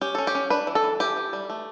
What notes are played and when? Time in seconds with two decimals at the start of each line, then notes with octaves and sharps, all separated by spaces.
0.01 C#4 G4
0.15 C#4 A4
0.27 G4
0.35 C#4
0.50 D4 B4
0.67 E3
0.75 A4
0.84 E3
1.00 E3 G4
1.16 E3
1.33 G3
1.50 A3